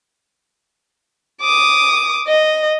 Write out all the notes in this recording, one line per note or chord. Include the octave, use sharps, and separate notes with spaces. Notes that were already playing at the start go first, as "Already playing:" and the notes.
D6 D#6
D#5